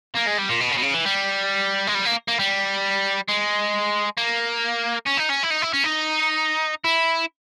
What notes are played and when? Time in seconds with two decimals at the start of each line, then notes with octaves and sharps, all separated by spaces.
0.17 A#3
0.28 G#3
0.39 G3
0.49 A#2
0.61 B2
0.71 C#3
0.77 B2
0.83 C#3
0.94 E3
1.05 G3
1.87 G#3
1.94 G3
2.05 A#3
2.28 A#3
2.39 G3
3.28 G#3
4.18 A#3
5.06 C#4
5.17 D#4
5.29 C#4
5.43 E4
5.50 D#4
5.62 E4
5.74 C#4
5.84 D#4
6.84 E4